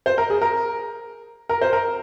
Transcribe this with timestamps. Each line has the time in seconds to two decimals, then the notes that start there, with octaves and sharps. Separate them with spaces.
0.06 C5
0.18 A#4
0.30 G#4
0.41 A#4
1.49 A#4
1.61 C5
1.73 A#4